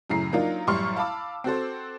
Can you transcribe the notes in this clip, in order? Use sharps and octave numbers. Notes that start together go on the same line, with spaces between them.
F#2 A2 C#3 A#5 C7
F#3 A#3 D4 D#4 F4
A1 F#2 G3 C6 C#6 F6
F5 A5 B5 D6 E6
C4 F#4 A4 C5